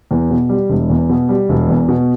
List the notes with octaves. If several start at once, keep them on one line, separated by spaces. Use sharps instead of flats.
E2
B2
G3
E1
E2
B2
G3
E1
E2
B2